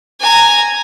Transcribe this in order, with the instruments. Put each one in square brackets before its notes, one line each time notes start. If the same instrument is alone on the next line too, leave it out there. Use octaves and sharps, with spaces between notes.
[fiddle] G#5 A#5